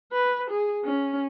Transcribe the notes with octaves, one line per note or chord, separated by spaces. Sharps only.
B4
G#4
C#4